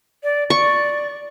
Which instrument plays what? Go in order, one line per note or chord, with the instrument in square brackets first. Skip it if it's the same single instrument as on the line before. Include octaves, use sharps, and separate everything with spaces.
[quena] D5
[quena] D5 [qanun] C#6